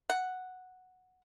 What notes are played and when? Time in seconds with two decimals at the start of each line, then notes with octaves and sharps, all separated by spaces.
0.10 F#5